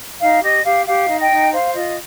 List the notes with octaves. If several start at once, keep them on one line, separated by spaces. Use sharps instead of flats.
D#4 F5
G4 D#5
G4 F5
G4 F5
D#4
D#5 G5
D#4
C5 F5
F4 D#5